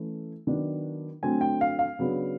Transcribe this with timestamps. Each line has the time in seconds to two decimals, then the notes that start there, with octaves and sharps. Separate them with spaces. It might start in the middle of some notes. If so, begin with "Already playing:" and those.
Already playing: E3 A3 C#4
0.47 D#3 F#3 B3 D4
1.23 D3 F#3 A3 C4 G#5
1.41 G5
1.61 F5
1.79 F5
1.99 C#3 F#3 B3 D4